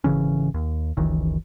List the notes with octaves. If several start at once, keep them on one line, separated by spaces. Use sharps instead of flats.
G#1 C#3 E3 C#4
D#2
F#1 C#2 D#3 E3